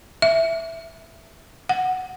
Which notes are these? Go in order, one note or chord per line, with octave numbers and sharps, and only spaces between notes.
E5
F#5